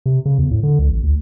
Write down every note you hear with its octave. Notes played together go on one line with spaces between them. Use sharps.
C3
C#3
E2
A2
D3
C#2
A1
D2